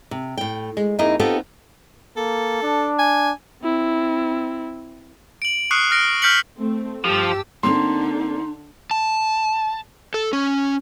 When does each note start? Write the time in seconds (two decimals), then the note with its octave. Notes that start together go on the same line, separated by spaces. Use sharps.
0.11 C3
0.37 A2 G5
0.77 G#3
0.99 F2 A#3 D#4 E4 G#4 D#5
1.19 B3 C4 D#4 F4 G4 A4
2.17 A#3 A4
2.63 D4
2.99 G#5
3.63 C4 E4
5.42 D7 F#7
5.71 C#6 D#6 F6 F#6 C7 C#7
5.91 F6 A#6 D7
6.22 F6 G6 B6 C#7 F#7
6.58 A3 C4
7.05 G2 F3 G4 A5 E6
7.63 D3 A#3 C4 D#4 C6
8.91 A5
10.14 A4
10.33 C#4